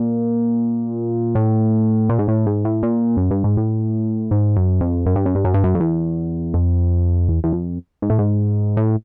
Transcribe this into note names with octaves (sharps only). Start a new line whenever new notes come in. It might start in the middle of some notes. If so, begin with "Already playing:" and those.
Already playing: A#2
A2
A#2
G#2
A2
G#2
A2
A#2
F#2
G2
G#2
A2
G#2
F#2
F2
F#2
G2
F#2
G2
F#2
G2
F#2
F2
E2
F2
E2
E2
F2
G#2
A2
G#2
A2